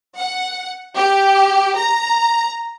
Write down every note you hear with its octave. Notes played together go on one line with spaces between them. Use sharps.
F#5
G4
A#5